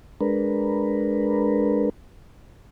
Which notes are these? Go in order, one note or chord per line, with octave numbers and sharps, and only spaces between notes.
G#3 D4 A#4 B4